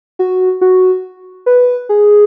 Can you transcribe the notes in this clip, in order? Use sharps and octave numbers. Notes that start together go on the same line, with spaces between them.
F#4
F#4
B4
G#4